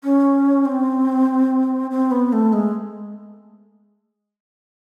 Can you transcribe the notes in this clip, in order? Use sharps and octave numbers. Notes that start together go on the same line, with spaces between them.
C#4
C4
C4
B3
A3
G#3